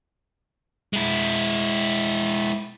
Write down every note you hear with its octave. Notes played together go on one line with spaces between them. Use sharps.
G#3 E4